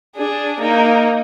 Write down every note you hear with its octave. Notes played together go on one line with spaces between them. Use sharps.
D4 G#4
A#3 D#4